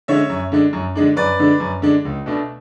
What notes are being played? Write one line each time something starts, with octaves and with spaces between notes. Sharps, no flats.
D3 G#3 C#4 C#5 E5
F#2
D3 G#3 D4
F#2
D3 G#3 D4
F#2 B4 D5
D3 G#3 D4
F#2
D3 G#3 D4
C#2
B2 A3 D4